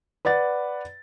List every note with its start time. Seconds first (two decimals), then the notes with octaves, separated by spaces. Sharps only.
0.25 B4 D5 F#5 A6